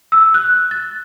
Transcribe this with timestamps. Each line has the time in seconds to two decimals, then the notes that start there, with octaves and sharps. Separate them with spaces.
0.12 E6
0.34 F#6
0.71 A6